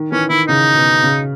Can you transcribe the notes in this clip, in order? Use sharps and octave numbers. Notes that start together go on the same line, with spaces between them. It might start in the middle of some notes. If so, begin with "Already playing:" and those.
Already playing: D#3
E3 C#4
D#3 E4
C#3 D#4
B2
C#3